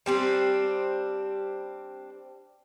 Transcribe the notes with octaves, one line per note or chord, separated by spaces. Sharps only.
G3 C4 D4